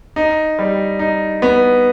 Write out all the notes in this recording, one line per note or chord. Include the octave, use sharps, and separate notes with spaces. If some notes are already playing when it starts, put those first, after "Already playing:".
D#4
G3
D#4
B3